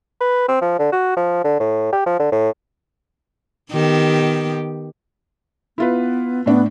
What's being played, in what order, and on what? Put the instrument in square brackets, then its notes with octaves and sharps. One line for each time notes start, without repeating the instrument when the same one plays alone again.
[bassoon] B4
C4
F3
D3
F#4
F3
D3
A2
G4
F3
D3
A2
[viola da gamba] D#3 B3 G4
[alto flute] B3 [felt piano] E4 F4 B4
[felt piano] A2 D4 [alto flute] B3